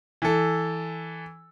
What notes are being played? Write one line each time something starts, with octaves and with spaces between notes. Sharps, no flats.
E3 A4